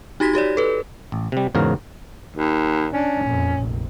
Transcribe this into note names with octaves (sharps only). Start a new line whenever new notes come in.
D#4 F#4 G4 G#6 A#6 B6
F#4 G4 C#5 D5
A4 B4
A1
C3 G3
E2 G#2 C#3 F#4 A#4 F5
D#2
C#4 D4
F2 A#2
F1 A#1